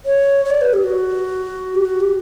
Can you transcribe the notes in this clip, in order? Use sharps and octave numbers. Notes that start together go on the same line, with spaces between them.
C#5
C#5
D5
B4
G4
F#4
G4
F#4
G4